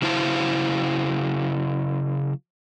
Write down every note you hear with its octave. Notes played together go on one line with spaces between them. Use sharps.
C#3 F#3 E4 C5 F5 A5